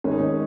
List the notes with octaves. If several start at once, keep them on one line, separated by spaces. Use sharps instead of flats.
G#1 C#4
D#4
C#4